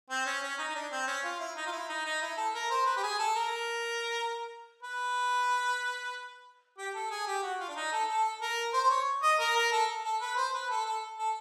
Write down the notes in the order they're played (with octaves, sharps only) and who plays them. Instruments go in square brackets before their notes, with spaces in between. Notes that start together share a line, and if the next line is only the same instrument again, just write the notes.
[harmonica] C4
C#4
C#4
D#4
D#4
D4
C4
C#4
F4
E4
D#4
F4
E4
D#4
D#4
E4
A4
A#4
C5
B4
G4
G#4
A4
A#4
B4
G4
A4
G#4
G4
F#4
F4
D4
D#4
A4
A4
A#4
C5
C5
C#5
D#5
A#4
A#4
A4
A4
B4
C5
B4
A4
A4
A4